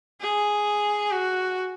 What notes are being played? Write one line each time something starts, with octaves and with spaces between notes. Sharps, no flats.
G#4
F#4